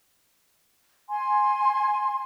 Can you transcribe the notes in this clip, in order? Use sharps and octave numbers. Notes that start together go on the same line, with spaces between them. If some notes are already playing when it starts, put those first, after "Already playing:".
G#5 C6